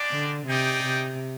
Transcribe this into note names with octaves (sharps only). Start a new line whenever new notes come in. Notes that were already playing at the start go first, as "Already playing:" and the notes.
Already playing: G#3 D4 G4 D5
D3
C3 D#4 G#4 D5 G5
C3